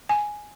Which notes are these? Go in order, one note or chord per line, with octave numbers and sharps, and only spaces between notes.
G#5